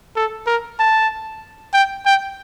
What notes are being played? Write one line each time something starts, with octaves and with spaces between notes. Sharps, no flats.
A4
A#4
A5
G5
G5